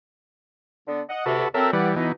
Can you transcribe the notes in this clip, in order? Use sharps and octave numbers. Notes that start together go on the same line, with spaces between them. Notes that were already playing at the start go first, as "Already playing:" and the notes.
D3 B3
D#5 F#5
D2 C3 F#4 A4 B4
F#3 C4 A4 A#4 E5
E3 G3 B4 D5 F#5
B2 E3 B3 D#4 D#5